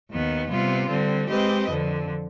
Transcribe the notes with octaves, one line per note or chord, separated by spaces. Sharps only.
D#2 D#3 B3
C3 G3 B3 F4
D3 G3 C4
G#3 C4 G4 B4 D#5
F2 D3 F3